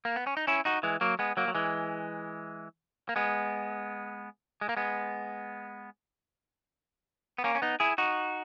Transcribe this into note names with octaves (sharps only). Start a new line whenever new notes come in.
A#3
B3
C#4
D#4
C#4 E4
D#4 F#4
E3 G#3
F#3 A#3
G#3 B3
F#3 A#3
F#3
E3 G#3
A#3
G#3 B3
G#3
A#3
G#3 B3
B3
A#3 C#4
C#4
B3 D#4
E4 G#4
D#4 F#4